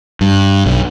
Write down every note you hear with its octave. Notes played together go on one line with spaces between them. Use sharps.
G2
B1